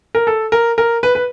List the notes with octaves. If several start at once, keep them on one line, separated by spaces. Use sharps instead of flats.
A#4
A4
A#4
A#4
B4
B4